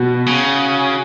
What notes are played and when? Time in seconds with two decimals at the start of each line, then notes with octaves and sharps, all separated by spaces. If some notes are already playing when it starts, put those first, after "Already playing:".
Already playing: B2 F#4
0.26 C#3